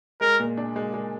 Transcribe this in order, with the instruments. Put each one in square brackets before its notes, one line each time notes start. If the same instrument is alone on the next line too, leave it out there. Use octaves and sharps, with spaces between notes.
[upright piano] G#3 [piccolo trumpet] A#4
[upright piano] A#2
D4
G#3
G#3